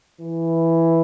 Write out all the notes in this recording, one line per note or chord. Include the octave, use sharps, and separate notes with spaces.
E3